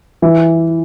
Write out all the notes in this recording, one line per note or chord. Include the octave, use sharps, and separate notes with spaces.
E3